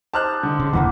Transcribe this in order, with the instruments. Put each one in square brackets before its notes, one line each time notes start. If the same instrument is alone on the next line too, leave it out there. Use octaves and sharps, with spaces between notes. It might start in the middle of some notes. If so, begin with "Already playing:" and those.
[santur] D#4 G4 C5 [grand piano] A5 F6 F#6
[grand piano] D3
[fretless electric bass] C#3
[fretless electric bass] F1 E2 E3 [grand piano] A#2 [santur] A#3 F#5 B5